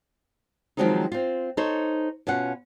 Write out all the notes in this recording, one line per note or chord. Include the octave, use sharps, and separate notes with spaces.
D#3 F3 F#3 G#3 C4 D#4
C4 F4
D#4 A4 C5 C#5
B2 C#4 F4 F#5